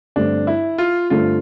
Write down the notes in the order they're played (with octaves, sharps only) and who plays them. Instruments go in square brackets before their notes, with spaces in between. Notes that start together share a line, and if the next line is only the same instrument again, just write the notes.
[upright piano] G2 D3 A3 C4 [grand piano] D4
[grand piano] E4
F4
[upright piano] G2 D3 A3 C4 [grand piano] F4